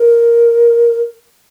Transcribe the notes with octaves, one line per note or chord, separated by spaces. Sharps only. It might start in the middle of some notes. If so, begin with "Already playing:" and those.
Already playing: A#4